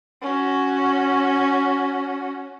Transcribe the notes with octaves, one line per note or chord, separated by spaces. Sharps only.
C#4 F#4